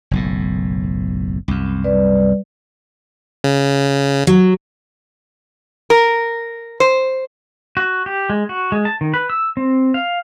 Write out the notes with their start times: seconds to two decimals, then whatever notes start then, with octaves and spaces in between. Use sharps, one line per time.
0.11 F#1 B1 A2
1.48 C2 F#2
1.84 G3 B4 D5
3.44 C#3
4.27 F#3
5.90 A#4
6.80 C5
7.77 F#4
8.06 G4
8.30 G#3
8.49 F#4
8.72 G#3
8.85 A5
9.01 D#3
9.14 B4
9.30 E6
9.57 C4
9.94 F5